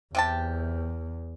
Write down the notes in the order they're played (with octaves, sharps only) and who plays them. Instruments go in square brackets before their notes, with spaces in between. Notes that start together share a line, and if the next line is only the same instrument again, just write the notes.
[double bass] E2 [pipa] C3 G4 A5